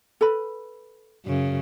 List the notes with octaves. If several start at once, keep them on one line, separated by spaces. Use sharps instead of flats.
A4 B4 B5
F#2 C#3